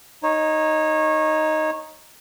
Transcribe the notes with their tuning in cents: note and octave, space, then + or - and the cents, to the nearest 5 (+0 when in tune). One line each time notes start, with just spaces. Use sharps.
D#4 +0 C#5 -20